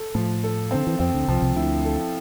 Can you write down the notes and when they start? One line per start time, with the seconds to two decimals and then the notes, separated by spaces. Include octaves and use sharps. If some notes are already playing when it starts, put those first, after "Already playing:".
Already playing: A4
0.15 A2 F3 A3
0.43 A4
0.71 D3 C4
0.87 E3
0.99 F2 F3 C4
1.13 D2 D3
1.28 C2 C3 F3
1.42 C2 C3
1.56 D2 D3 E4
1.85 A4